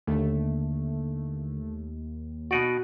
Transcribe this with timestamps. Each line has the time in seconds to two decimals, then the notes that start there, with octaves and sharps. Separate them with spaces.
0.07 D#2 D3 A3
2.51 B2 D#4 F#4 D5 F#5